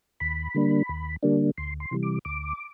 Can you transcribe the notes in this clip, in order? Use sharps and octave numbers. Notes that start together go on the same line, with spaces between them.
D#2 B5
D3 G3 A#3 D4
D#2
D3 G3 A#3 D4
D2 C6
C6
C3 E3 G3
D6
D2 D6